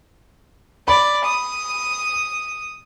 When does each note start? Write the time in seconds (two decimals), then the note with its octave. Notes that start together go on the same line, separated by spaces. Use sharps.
0.88 D5 B5
1.25 D#6